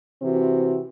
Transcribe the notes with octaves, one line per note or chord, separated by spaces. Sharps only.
C3 E3 C4 F#4